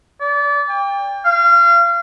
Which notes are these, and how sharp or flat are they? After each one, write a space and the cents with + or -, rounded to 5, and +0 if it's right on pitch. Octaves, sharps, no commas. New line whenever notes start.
D5 -30
G5 +30
F5 -30